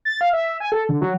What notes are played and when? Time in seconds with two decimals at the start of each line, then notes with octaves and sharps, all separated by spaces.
0.05 A6
0.21 F5
0.33 E5
0.60 G#5
0.72 A4
0.89 D3
1.01 F#3